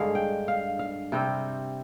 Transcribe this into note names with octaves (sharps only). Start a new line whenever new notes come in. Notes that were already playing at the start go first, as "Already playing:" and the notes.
Already playing: G2 D3 G#3 F5
G5
F5
F5
C3 G3 C4 G5